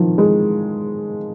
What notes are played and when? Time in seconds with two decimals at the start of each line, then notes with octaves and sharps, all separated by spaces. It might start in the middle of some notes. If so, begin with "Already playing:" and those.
Already playing: D#3 F3
0.18 G#3